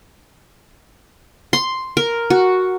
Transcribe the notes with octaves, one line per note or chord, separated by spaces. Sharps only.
C6
A#4
F#4